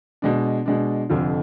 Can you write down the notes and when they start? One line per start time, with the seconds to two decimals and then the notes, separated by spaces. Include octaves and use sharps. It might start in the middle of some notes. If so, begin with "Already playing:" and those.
0.22 B2 G#3 D4
0.66 B2 G#3 D4
1.10 F1 F2 D3 F3